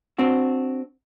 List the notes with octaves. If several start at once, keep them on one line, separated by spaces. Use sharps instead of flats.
C4 D4 F#4